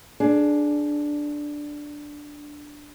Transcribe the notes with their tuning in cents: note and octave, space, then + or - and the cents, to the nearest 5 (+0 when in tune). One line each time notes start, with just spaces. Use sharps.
D4 +0 G#4 +20